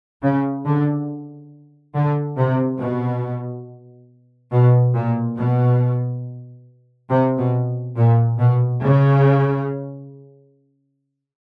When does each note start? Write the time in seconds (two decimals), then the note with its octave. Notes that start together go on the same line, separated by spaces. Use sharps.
0.23 C#3
0.65 D3
1.94 D3
2.37 C3
2.80 B2
4.52 B2
4.95 A#2
5.37 B2
7.10 C3
7.39 B2
7.96 A#2
8.39 B2
8.82 C#3